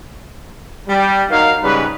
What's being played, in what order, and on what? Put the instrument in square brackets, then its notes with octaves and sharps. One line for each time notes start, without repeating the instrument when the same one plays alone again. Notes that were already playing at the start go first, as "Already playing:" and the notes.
[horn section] G3
F#3 D#4 A#4 F5
G#2 C#3 G3 B4